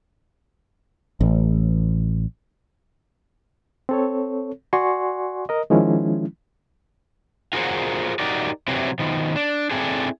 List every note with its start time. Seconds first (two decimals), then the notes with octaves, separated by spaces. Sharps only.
1.21 A1
3.89 C4 A4 C#5
4.73 F#4 D5 F#5 G#5 C6 C#6
5.49 A#4 D#5
5.70 D#3 F3 G#3 C#4 E4
7.53 F4 F#4 G#4 A#4 C5 F#5
8.19 D#4 F#4 G4 A#4 D5
8.68 C3 E3 F#3 C4
8.99 B2 D#3 F3
9.36 D4
9.71 C4 D4 E4 G#4 A4